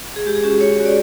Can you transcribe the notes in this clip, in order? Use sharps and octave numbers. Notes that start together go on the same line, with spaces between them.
G#4
G#3 G4
G#4
C#4 F#4 G4
G#3 C#5
C#4 F#4
D5